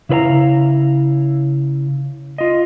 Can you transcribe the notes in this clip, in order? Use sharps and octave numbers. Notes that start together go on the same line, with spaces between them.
C#3 E4 B4 F5 A#5
F4 D#5